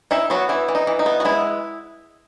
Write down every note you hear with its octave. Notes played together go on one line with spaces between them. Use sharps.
D#4 E4 E5
F#3 B3 F#4
E3 E4
E3
D#4
E3
D#4
B3
F#4
G#3 E4